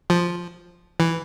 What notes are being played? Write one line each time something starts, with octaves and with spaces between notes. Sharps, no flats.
F3
E3